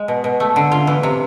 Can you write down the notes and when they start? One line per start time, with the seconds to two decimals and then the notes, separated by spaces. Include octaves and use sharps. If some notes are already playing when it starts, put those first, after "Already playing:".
Already playing: G#3
0.08 B2
0.24 B2
0.40 A3
0.56 D3
0.72 F4
0.87 E3
1.03 C3